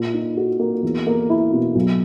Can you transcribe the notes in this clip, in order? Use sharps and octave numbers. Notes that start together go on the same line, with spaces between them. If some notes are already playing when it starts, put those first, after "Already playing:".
Already playing: A#2
D#4
F#4
A#3
E2
A#3
E4
B2
B1